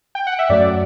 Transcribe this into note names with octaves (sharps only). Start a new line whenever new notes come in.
G5
F#5
E5
F#2 F#3 A3 D5